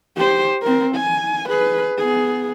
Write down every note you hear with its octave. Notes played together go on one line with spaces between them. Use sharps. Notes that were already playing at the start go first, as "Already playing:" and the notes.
G4 C5
C4 A#4
G#5
G#4 B4
B3 G#4